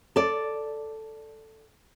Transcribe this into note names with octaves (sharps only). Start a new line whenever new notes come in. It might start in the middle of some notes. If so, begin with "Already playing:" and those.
A4 D5